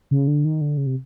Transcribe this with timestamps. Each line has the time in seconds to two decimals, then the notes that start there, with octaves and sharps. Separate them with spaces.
0.11 C#3
0.27 D3
0.45 D#3
0.61 D3
0.77 C#3
0.86 C3